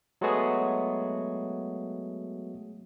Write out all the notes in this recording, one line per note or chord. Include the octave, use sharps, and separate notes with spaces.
F#3 G#3 A3 B3 F#4 G#4